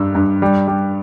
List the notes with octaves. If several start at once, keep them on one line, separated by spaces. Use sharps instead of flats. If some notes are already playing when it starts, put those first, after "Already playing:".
Already playing: G2 G3 E6
G2
G3
G3